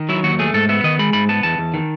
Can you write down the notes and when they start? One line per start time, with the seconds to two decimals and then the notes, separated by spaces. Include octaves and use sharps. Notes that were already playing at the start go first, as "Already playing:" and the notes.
Already playing: D#3
0.09 F#3 E4
0.24 D#2 F#4
0.39 A3 G#4
0.54 G#2 A4
0.69 B3 E5
0.84 D#3 D#5
0.99 G#3 B5
1.13 G#2 B5
1.29 B3 A5
1.43 E2 A5
1.58 E2
1.74 D#3